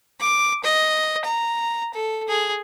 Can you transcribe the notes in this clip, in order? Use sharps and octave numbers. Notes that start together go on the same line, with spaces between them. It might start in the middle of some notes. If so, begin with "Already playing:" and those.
D6
D#5
A#5
A4
G#4